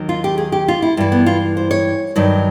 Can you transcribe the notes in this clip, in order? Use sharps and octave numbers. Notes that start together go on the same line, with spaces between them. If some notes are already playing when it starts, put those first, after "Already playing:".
Already playing: D#2 D#3 F#3
F4
G4
G#4
G4
F4
E4
G2 E3
B3
F4
C5
C#5
G2 D#3 F#3